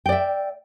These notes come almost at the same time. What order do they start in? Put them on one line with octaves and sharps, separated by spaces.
G5 D5 E5